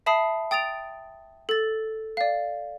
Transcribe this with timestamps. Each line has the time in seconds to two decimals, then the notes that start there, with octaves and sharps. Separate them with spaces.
0.06 E5 A5 B5 D#6 C7
0.51 G5 D#6 A6 D7 F7
1.49 A4 A6
2.17 D5 F5